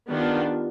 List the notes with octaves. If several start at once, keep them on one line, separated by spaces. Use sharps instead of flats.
D#3 B3 D4 F4 G4
F4